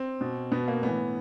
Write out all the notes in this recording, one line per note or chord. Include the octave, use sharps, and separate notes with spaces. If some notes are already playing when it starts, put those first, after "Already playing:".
Already playing: C4
B2
B2 B3
A#3
A2 E3 B3